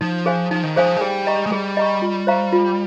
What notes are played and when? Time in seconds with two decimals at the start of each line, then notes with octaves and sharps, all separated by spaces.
0.01 F3 D#4
0.26 G#4 C5 F5 G#5
0.51 F3 D#4
0.63 D#3
0.76 F3 G#4 C5 F5 G#5
0.96 G#3
1.01 G3 G#4
1.27 D#5 A#5 C#6
1.46 G#3
1.51 G3 G#4
1.77 D#5 A#5 C#6
2.02 F4
2.27 C5 F5 A#5 C#6
2.52 F4